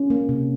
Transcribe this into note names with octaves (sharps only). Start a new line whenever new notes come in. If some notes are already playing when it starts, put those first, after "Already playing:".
Already playing: C#4
A#3
C3